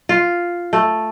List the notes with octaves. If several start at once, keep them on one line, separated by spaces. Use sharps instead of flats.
F4
A3